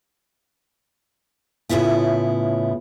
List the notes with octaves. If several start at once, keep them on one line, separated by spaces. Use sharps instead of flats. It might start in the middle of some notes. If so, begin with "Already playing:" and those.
A2 C#3 B3 E4 F4